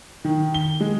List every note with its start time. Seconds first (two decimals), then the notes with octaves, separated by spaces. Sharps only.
0.25 D#3
0.54 G7
0.81 G#3